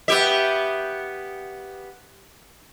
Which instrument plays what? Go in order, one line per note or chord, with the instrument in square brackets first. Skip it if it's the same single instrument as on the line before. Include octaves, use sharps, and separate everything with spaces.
[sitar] B3 G4 E5